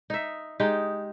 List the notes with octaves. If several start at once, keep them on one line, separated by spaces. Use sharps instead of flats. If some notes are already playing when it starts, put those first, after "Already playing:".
D#4 E5
G#3 D#4 G4